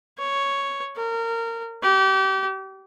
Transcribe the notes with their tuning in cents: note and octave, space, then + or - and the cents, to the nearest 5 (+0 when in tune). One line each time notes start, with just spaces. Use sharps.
C#5 +0
A#4 -25
G4 -30